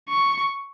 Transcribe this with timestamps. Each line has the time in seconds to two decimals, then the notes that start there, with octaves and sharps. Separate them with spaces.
0.09 C#6